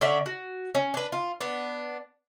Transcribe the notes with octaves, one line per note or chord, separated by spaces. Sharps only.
D3 C#4 D5 E5
F#4
C#4
D4 B4
F4
B3 D4